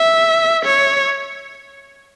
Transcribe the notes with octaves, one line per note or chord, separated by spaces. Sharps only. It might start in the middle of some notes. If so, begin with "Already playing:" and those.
Already playing: E5
C#5